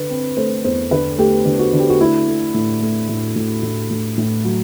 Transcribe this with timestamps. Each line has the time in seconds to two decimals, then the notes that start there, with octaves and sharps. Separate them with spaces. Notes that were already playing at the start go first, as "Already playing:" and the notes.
Already playing: D3 B4
0.10 C4
0.37 A3 C5
0.64 E2 C5
0.91 D3 B4
1.18 A3 G4
1.45 D3
1.59 F#4
1.73 D3
1.79 G4
1.90 F#4
2.00 A3 E4
2.27 A3
2.54 A2
2.82 A3
3.09 A2
3.36 A2
3.63 A2
3.90 A2
4.18 A2
4.45 F#3